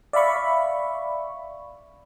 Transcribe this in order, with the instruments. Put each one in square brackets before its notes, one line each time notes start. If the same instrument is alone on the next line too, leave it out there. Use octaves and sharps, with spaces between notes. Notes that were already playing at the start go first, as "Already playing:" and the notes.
[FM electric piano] D5 E5 F5 B5 C#6